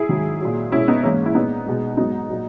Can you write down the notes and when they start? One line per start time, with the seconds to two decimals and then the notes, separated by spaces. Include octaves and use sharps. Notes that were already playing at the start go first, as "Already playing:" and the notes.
Already playing: E4 G#4
0.09 G#2 D#3 F#3
0.41 A#2 F#3
0.72 B2 G#3 C#4 E4
0.88 B3 D#4
1.03 G#2 E3 G#3 A#3 C#4
1.26 E4
1.35 A#2 G#3 B3 D#4
1.66 B2 G#3
1.97 G#2 F#3 B3 D#4
2.29 A#2 F#3